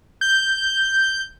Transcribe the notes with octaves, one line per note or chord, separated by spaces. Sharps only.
G6